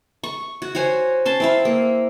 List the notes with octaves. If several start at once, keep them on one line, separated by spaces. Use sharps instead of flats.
C#6
F#4
F#4 C5 C#5 G#5
C#4 A5 C6
C4 E4 F5
A#3